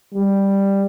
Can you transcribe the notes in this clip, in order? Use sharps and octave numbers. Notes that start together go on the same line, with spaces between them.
G3